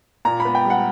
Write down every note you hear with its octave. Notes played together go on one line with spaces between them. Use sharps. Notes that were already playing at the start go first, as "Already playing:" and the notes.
A#2 A#5
B5
B3
G5
G3 F#5